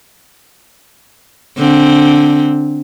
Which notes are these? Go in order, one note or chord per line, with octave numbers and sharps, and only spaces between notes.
D3 C4